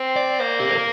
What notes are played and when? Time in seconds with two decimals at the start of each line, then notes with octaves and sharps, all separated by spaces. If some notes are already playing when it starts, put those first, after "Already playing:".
Already playing: C4
0.16 D5
0.40 A#3 C5
0.60 G4
0.69 A4
0.78 A#4